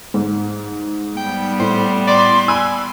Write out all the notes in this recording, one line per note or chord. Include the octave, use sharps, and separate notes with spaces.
G#2
G3 B3 G5
A2 C5
D5 C6
G#5 B5 E6 F#6